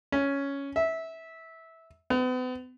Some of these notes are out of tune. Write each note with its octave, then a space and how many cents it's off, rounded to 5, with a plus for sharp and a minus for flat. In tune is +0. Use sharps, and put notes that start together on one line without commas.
C#4 +5
E5 -15
B3 +40